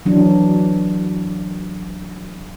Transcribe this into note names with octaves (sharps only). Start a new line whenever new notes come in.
E3 F#3 D4